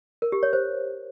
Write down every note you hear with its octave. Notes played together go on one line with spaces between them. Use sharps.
A#4
G4
C#5
C5